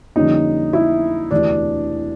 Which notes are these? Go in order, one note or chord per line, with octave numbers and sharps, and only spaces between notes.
F2 D3 G3 A#3 C#4 D#4
E4
E1 D2 C3 E3 D4